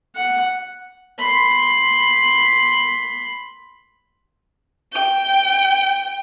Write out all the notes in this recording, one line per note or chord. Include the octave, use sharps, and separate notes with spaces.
F#5
B5 C6
G5